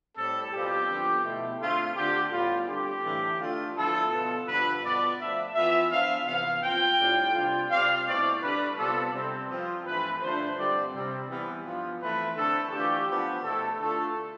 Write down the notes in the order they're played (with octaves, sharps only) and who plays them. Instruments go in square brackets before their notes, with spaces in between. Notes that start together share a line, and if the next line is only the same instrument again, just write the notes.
[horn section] A2 G3 C4 A4
B2 G3 C4 F4 G4
D3 F3 B3
B2 A3 E4
D3 A3 C4 F4
D3 A3 D4 F4 G4
A2 G3 B3 F4
D3 G3 C4 G4
A2 E3 A3 D4
D3 A3 D4 F4
D3 F3 B3 E4 A4
B2 B3 F4
G2 D3 F3 B3 B4
B2 B3 F4 D5
F3 A3 D4 E5
E3 B3 F4 E5
F3 B3 D4 F4 F5
C3 E3 B3 F5
F3 C4 F4 G5
A2 G3 D4 F4
C3 G3 D4 F4
C3 G3 C4 F4 F5
B2 A3 C4 E4 D5
D3 G3 D4 B4
C3 G3 B3 F4 A4
C3 G3 C4
F3 C4 F4
G2 E3 A3 B4
G2 D3 F3 A3 D4 C5
G2 D3 G3 C4 D5
C3 G3 C4
E3 G3 B3
G2 F3 B3 F4
E3 A3 C4 B4
D3 A3 C4 E4 A4
E3 A3 D4 F4 G4
F3 B3 D4 F4
B2 A3 E4 A4
D3 A3 D4 F4 A4